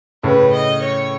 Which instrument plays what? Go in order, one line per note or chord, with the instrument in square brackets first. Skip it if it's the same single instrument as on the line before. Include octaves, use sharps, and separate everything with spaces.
[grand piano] A2 C#3 [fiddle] B4
[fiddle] D#5
C#5